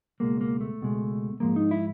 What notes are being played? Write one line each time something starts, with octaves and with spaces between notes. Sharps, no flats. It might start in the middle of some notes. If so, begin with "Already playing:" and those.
C#2 B2 G#3 A#3
A#3
A3
C#2 B2 G#3
G#2 F3 G#3 A#3
D#4
E4